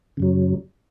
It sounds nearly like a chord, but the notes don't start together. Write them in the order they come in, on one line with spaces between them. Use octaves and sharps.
C#3 F#2 F#3